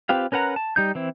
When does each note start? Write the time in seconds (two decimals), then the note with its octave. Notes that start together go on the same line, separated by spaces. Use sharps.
0.09 C4 F4 G4 B4 F5
0.32 C#4 A#4 B4 F#5 A#5
0.56 A5
0.76 G3 D#4 G6
0.95 E3 C4 E4